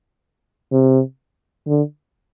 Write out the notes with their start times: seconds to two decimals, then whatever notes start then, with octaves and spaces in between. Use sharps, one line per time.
0.72 C3
1.67 D3